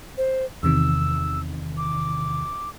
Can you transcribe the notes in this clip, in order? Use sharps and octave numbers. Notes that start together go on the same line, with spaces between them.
C5
E2 C3 D#3 E6
D6